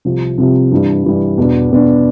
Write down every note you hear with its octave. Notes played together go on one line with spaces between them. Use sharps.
C2 C3 F3
C2 C3 F3
G2 E3 G3
G2 E3 G3
E2 B2 B3 D4
E2 B2 B3 D4